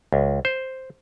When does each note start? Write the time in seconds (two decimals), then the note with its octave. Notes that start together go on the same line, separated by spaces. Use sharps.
0.13 C#2
0.45 C5